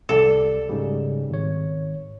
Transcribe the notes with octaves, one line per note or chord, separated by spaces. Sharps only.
C2 A4 D5
G#2 C#3 G3
G#1 C#5